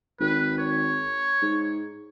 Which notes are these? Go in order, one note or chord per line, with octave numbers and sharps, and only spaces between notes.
G#1 B4
C#5
G#2